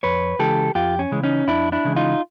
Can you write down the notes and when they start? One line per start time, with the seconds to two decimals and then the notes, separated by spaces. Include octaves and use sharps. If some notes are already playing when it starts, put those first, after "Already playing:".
0.03 F2 B4 C#5
0.39 C#3 E3 G#3 G4 A4
0.75 F2 F4 G4
0.99 C#4
1.12 C#3 E3 G#3
1.23 C#4 D#4
1.47 F2 D4 E4
1.72 D4 E4
1.85 C#3 E3 G#3
1.96 D#4 F4